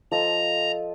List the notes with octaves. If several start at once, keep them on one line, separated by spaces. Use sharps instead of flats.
F3 A4 D#5 A#5